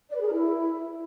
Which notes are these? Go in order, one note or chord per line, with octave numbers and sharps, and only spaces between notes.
D5
B4
G#4
A#4
E4